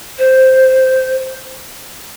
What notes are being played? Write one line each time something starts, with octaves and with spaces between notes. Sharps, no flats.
C5